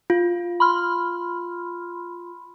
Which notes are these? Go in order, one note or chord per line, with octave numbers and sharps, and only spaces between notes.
F4
B5 C6 F6